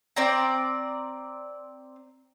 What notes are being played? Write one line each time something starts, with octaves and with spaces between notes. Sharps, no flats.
C4 D5 A#5